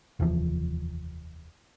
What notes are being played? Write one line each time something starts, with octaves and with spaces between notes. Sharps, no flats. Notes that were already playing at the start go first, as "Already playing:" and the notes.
F1 D#2 E3 F3